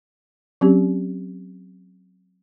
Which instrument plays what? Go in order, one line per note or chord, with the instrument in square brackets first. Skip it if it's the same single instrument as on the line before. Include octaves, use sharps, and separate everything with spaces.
[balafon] F#3 C4 C#4 G4